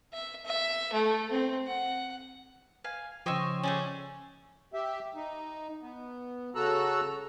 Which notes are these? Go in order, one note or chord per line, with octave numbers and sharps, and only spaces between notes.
E5
E5
A3
C4
F#5
F5 G#5
C#3 F3 C5 C#5 D#5 G5 C#6 E6
A3 C#4 G#4 D5
G4 E5
D#4
B3
C#3 F#4 A4 A#5 E6 F#6